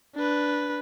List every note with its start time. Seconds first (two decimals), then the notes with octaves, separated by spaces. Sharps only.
0.16 D4 B4